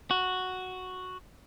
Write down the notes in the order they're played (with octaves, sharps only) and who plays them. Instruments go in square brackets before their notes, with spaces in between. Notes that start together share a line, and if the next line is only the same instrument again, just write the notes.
[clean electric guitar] F#4